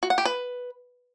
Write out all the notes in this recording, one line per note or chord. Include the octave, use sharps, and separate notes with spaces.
F#4
F#5
G4
B4